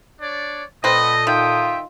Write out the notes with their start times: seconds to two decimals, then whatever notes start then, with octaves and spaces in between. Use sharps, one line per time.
0.21 D4 C#5 D5
0.84 A#2 A3 C4 A4 B4 D#5 D#6
1.27 D#3 F4 E5 G5